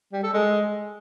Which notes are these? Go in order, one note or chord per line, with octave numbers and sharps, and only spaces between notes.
G3
A4
G#3